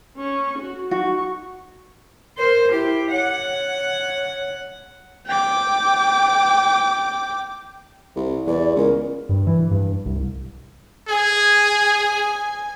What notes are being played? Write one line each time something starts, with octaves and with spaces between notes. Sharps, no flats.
C#4 C#6
F#4
D#4 F#4 C#6
A#4 C5
E4 G4
C#5 F#5
G5 D6
C2
E2 D5
C#2 A#4
G2
E3
G2
C2
G#4 G#5